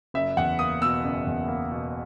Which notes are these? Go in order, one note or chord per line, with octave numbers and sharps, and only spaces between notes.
F#1 E5
E2 F#5
A#3 D#6
B2 E6
F#1
E2
A#3
B2